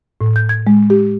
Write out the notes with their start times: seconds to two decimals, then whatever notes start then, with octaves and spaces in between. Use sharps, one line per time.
0.21 A2
0.36 G6
0.49 G#6
0.67 G#3
0.90 G4